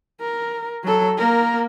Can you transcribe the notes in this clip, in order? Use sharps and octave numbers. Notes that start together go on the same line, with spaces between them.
A#4
F#3 A4
A#3 A#4